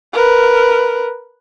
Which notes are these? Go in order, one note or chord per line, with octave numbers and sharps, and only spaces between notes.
A#4 B4